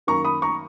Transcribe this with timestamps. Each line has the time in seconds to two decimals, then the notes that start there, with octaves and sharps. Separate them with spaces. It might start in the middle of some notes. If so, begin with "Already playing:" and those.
0.07 F#2 D#3 A#3 A#5 C#6
0.24 B5 D#6
0.42 A#5 C#6